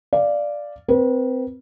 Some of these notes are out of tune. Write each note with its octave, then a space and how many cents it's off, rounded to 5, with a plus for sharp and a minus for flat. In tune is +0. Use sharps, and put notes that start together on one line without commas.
D5 +0 F5 -10
C4 -20 B4 -40